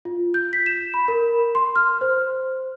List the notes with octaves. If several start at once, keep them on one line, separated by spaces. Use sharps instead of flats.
F4
G6
B6
E7
B5
A#4
C6
F6
C5